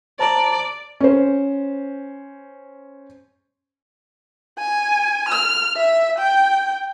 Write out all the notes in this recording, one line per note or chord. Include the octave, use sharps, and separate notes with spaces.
C5 D5 A5 A#5
C#4 C5
G#5
F6
E5
G5